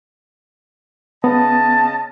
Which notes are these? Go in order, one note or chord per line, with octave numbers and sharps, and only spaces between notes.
C#3 B3 D#5 A5